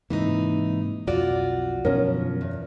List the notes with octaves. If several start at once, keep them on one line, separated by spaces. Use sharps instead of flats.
G#2 C3 E3 A#3 D#4
B1 F2 F4 F#4 D5
F#2 B2 D3 F3 C#4 A#4
E2